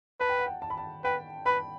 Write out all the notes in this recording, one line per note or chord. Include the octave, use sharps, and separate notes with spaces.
B4 A5
G5
F#5
G5
A5
B5
A5
B4 G5
B4 B5